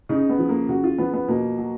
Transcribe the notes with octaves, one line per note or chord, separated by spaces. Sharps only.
C#3 D#4
B3
F3
A#3
C#3 F#4
F4
F3 B3
B3
B2 A#3
F#3